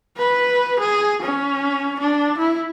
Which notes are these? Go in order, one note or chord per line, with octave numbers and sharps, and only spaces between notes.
B4
G#4
C#4
D4
E4